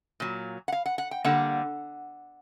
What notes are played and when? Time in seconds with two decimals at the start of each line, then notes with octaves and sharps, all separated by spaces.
0.20 A#2 F#3
0.68 F#5
0.72 F5
0.86 F#5
0.98 F#5
1.11 G5
1.24 D3 G3 A#3 F#5